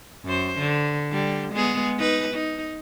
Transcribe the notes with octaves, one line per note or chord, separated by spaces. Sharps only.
F#2 C5
D3
D3 G3
G#3 B3 G#4
D#4 B4
D#4